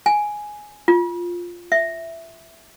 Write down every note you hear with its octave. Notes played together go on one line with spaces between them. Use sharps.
G#5
F4
E5